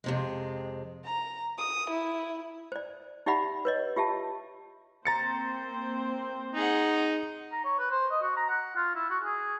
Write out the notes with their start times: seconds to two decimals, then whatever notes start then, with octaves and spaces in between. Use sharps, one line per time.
0.04 F2 C3 G#3
1.05 A#5
1.58 D#6
1.91 E4
2.72 C5 D5
3.26 D#4 G4 D5 E5 F#5 B5
3.65 B4 C#5 D#5
3.96 F4 G4 E5 A5
5.05 A#3 C4 C5 A#5 A6 C#7
6.55 D#4 G#4 F#5
7.52 A#5
7.64 C#5
7.79 B4
7.91 C5
8.11 D#5
8.22 F#4
8.37 A#5
8.49 F#5
8.76 F4
8.95 E4
9.10 F#4
9.23 G#4